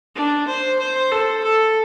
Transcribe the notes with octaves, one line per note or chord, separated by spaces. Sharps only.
D4
C5
C5
A4
A4